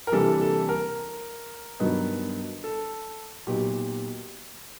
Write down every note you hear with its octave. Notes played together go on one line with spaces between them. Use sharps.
A#4
C3 E3 G3 A#3 D4 A4
A4
A#4
G2 D#3 F#3 B3 D#4
A4
A#2 F#3 B3 D#4 G4